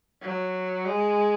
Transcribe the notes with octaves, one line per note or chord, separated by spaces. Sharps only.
F#3
G#3